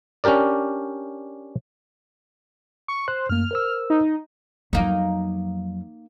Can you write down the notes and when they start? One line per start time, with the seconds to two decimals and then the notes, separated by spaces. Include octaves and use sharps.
0.24 C#4 D4 G4 A#4 D5
2.88 C#6
3.08 C5 F#6
3.29 F#2 A3 A#3 F6
3.51 A#4 C5 E6
3.90 D#4
4.73 F2 F#3 A#3 D#4